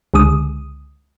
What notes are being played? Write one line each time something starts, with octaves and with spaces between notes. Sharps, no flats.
C#2 D3 G#3 D#6